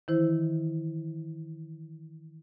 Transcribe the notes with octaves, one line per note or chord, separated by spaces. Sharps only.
D#3 E3 E4 C5